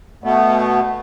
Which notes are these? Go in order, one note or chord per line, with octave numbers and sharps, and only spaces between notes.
B2 A3 B3